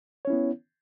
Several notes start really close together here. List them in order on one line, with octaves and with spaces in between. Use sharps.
C#5 C#4 E4 B3